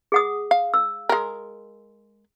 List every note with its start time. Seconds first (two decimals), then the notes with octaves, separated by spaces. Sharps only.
0.12 G#4 F#5 D#6
0.51 F5
0.74 E6
1.09 G#3 A#4